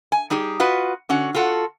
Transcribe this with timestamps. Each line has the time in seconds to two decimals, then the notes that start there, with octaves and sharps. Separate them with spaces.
0.12 G#5
0.30 G3 D#4 G4 G#4
0.60 F4 F#4 B4 D#5
1.09 D3 C#4 F#4 F#5
1.35 F4 F#4 A4 F#5